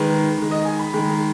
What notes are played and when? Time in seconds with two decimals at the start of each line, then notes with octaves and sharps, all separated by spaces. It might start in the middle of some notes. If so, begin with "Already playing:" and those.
Already playing: D#3 G#3 B4
0.38 D#3 G#3
0.51 D#5
0.65 G#5
0.79 B5
0.94 D#3 G#3